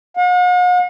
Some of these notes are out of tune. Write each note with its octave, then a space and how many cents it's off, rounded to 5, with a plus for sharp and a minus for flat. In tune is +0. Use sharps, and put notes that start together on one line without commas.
F#5 -45